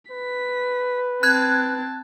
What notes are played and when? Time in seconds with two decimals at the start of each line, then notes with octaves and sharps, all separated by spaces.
0.11 B4 B6
1.23 C4 A5 F#6 G#6